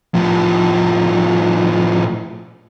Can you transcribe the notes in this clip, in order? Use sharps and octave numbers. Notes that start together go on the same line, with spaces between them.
A2 F3